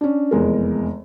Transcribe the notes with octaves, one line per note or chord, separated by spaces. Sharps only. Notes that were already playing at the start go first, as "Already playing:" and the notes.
C#4 D4
F1 E2 G#3 A#4